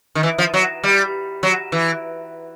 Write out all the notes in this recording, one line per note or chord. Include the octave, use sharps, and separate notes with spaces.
D#3
E3
F3
F#3
G3
F#3
E3